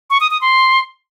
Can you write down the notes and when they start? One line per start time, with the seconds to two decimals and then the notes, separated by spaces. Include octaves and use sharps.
0.10 C#6
0.21 D#6
0.31 D#6
0.41 C6